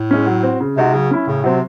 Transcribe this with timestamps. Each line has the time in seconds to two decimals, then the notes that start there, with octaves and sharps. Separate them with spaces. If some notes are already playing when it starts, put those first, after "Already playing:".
Already playing: A2
0.11 G#3 C#4
0.26 F#3
0.43 C4 F#4
0.60 C#3
0.76 C3 G#3 D#4 F#4
0.93 C#3 F#3
1.11 C#4 E4
1.27 A2 C#3
1.44 C3 F#3 C4